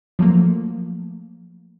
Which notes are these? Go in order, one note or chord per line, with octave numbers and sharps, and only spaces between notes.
F3 F#3 A3 A#3